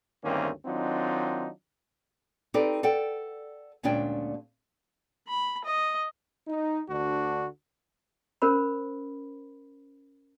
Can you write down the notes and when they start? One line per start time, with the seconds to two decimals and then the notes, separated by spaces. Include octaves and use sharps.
0.24 D2 G2 D#3 A#3 C4 C#4
0.66 D#3 F#3 C4 D4 D#4 F4
2.54 C4 D#4 G4 A4 B4 D5
2.83 A4 D5 F#5 G5
3.83 D2 A#2 G#3 C#4 D4 G5
5.28 B5
5.65 D#5
6.48 D#4
6.89 D2 D3 D4 F#4
8.42 C#4 A#4 C5 B5